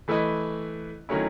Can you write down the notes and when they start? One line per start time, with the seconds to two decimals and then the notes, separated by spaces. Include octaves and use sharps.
0.08 E3 A3 E4 B4 D#5
1.09 D#3 F#3 A3 C#4 E4